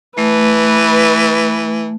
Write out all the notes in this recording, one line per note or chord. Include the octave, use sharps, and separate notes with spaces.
E3 A3 B4